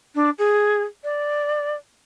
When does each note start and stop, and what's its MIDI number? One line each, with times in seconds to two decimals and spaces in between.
0.15 0.30 62
0.38 0.82 68
1.04 1.74 74